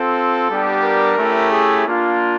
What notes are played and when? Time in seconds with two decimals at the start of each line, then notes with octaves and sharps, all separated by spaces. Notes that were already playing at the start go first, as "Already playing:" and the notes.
Already playing: C4 F4 A4
0.49 G3 B3 D4 G4
0.83 A#4
1.18 A3 C#4 E4 G4
1.52 G#4
1.87 A#3 D4 F4